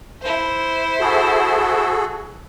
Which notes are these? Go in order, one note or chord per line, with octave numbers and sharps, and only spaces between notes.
E4 C5
F#4 G#4 A4